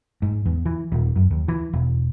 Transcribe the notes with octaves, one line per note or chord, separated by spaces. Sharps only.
G#2
E2
E3
D#1
F#2
D#2
E3
E1